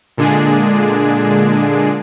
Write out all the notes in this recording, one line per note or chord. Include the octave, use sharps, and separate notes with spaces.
A#2 D3 G#3 D4 G#4